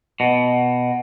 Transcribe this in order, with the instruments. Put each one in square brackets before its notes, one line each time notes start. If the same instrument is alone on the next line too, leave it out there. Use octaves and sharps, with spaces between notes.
[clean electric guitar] B2